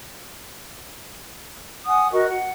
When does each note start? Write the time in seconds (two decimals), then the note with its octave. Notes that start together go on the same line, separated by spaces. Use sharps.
1.87 F#5 G#5 D#6
2.11 F#4 A#4 D#5 C#6
2.28 F#5